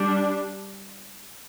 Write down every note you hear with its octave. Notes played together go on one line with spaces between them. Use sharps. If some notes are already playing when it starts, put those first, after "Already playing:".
Already playing: G3 D4